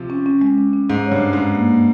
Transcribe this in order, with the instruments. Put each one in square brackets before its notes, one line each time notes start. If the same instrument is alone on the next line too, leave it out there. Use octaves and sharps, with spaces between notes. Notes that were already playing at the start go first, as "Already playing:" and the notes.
Already playing: [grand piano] C3 F3
[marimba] C#4
C#4
G#3
C#4
C#4
[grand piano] G#2 [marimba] G#4
[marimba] C#5
[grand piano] G2
[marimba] C#4
[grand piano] G#2
[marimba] G#3
A#3
A#3